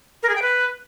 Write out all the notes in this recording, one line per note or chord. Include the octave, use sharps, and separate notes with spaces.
A#4
G#4
G5
B4